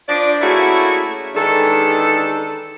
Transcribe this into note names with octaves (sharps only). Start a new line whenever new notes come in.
F3 D4 D5
A3 A#3 C#4 E4 F#4 G#4
D#3 E3 G#3 D4 A4